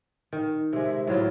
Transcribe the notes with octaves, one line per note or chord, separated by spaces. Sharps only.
D#3
C3 G#3 E5
A2 F#3 E4 F4